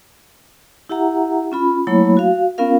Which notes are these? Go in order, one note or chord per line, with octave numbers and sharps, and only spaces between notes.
E4 G4 E5 F#5 A#5
C#4 F4 B5
F#3 A3 A#3 E4 C#5 B5
F#4 F5
B3 C#4 F4 A#4 F5